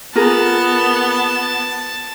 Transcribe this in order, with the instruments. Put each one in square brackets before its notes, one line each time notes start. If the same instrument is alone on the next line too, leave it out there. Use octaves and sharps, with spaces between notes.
[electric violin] B3 [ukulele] F4 G#4 A#4 [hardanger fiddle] A5